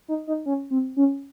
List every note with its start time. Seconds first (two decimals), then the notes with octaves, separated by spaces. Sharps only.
0.08 D#4
0.27 D#4
0.46 C#4
0.71 C4
0.97 C#4